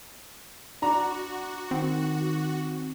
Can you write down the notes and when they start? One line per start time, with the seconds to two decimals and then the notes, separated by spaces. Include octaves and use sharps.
0.82 D4 F#4 A#5
1.71 D#3 C4